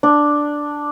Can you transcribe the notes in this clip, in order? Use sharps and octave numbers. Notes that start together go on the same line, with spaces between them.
D4